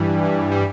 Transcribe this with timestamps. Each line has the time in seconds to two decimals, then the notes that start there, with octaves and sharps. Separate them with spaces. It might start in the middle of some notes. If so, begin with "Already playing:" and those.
Already playing: G2 E3 G3
0.22 G2 E3 G3
0.52 G3